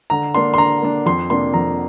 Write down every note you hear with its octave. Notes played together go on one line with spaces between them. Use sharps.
D3 A#5
A#3 D4 C6
C6
D3 A#5
A#3 D4
F2 C6
C3 A#3 D4 C6
F2 A#5